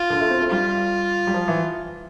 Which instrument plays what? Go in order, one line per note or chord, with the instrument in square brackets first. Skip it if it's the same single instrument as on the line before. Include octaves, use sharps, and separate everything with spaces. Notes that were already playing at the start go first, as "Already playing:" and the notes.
Already playing: [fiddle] F4
[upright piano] D3
A3
C4
A3
[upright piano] G3 [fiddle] F4
[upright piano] G3
F3
E3